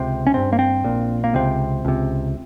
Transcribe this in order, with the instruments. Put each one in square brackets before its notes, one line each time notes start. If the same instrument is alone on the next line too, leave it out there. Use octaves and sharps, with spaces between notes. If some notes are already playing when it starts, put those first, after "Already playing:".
Already playing: [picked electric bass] C#2 C3 C4
C#4
G#1 G2 C4
A#3
C4
A#1 A#2
A#3
C#2 C3 C4
C#2 C3